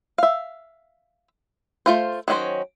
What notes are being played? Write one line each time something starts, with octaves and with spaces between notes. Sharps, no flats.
E5 F5
A3 F4 C5
D#3 F#3 A3 C#4 C5